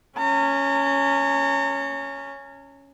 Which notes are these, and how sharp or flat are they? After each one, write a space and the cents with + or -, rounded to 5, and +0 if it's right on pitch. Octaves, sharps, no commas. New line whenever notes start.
C#4 +0 A#5 -40